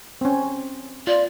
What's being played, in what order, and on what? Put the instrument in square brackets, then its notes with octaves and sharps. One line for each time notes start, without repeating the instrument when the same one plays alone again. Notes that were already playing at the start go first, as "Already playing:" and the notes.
[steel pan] C4 C#4
[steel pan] F4 [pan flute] D5